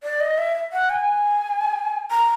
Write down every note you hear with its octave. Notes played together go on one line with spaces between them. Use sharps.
D5
D#5
E5
F#5
G#5
A#5